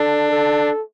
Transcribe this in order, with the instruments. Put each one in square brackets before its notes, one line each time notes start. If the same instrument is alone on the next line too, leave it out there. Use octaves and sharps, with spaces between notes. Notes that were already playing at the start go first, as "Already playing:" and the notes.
Already playing: [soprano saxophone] D4 [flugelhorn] A4
[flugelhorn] A4